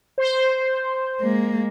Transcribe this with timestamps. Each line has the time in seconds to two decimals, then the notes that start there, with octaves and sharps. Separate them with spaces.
0.18 C5
1.21 G#3 A#3